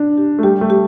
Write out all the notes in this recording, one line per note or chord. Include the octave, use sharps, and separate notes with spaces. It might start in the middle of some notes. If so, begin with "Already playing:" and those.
Already playing: D4
G4
A3
G3 G4
A3
G4